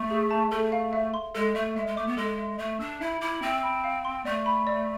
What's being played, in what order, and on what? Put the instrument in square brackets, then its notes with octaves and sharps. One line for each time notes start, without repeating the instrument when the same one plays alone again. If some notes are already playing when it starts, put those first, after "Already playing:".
Already playing: [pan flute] A3
[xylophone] G#4
A5
[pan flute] A3 [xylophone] A4
[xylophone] F5
E5
C6
[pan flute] G#3 [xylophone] A4
[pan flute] A3 [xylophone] E5
[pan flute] G#3 [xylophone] E5
[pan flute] G#3
[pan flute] A3 [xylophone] D6
[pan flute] B3
[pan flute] G#3 [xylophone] A4
[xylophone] E5
[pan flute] A3 [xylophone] E5
[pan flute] D4 [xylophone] E6
[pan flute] E4 [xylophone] E5
[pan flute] E4 [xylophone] D6
[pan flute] C4 [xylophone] E5
[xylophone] B5
F5
C6
[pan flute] A3 [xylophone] D5
[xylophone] B5
D5